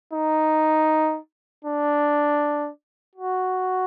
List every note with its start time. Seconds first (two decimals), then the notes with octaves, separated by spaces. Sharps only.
0.13 D#4
1.64 D4
3.15 F#4